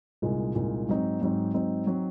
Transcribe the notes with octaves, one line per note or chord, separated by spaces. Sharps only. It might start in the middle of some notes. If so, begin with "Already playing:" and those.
C2 A#2 G#3 D#4
C2 A#2 G#3 D#4
G#2 F#3 C4 D#4
G#2 F#3 C4 D#4
G#2 F#3 C4 D#4
F#3 C4 D#4